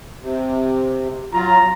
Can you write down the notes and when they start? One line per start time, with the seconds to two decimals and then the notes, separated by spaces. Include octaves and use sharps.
0.22 C3
1.33 F#3 F4 A#5